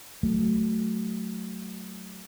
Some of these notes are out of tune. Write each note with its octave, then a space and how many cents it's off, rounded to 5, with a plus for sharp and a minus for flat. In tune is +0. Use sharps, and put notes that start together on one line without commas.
F#3 +15 A3 +0